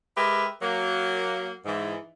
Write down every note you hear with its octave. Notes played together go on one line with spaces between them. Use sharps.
G#3 G4 A#4 B4 E5
F#3 A#3
G#2 E3